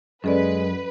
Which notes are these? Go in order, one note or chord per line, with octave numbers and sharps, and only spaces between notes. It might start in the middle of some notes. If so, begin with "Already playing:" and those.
F#2 G#3 C#4 A4 B4 D5